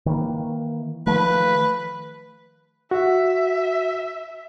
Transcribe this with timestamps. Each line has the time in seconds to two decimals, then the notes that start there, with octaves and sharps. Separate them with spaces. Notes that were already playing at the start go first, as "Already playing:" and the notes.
0.06 D#3 E3 A#3
1.07 D#3 F3 A3 B4
2.91 F#4 E5